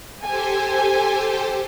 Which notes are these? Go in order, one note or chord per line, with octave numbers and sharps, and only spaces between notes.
G4 A4 C5 G#5